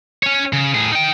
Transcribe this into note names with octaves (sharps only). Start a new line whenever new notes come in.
C#4 C#5
C#3
A2 G#4
D#4 G5